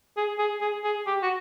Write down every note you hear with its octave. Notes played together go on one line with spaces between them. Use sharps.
G#4
G#4
G#4
G#4
G4
F#4